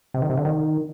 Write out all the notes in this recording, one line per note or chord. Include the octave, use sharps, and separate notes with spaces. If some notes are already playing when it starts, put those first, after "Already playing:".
C3
D#3
C3
D3
D#3